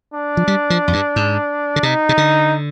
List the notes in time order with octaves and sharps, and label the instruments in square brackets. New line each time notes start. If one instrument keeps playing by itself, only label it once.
[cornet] D4
[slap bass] F3
G3
F3
F2
G2
G#2
D3
[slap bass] C3 [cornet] D#4
[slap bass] C3
D3